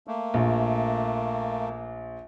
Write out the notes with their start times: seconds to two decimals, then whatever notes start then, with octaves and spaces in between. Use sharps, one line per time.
0.07 A3 A#3
0.34 A#1